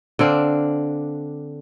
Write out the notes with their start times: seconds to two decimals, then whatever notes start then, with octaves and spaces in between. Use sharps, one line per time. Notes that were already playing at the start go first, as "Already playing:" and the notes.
0.19 D3 C4 D4 F5